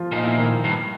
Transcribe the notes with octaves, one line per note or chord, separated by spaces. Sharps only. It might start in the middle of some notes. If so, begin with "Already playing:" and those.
Already playing: F3 F4
A#2 D#4
E4
D#3 D#4
G2